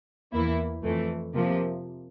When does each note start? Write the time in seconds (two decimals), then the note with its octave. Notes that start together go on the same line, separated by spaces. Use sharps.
0.33 E2 E3 A#3 E4
0.84 F2 E3 A3
1.35 C3 F3 A#3